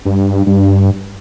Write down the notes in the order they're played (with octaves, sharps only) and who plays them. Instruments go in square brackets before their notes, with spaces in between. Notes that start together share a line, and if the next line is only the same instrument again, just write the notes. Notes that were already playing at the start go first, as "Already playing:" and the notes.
[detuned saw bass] G2
G2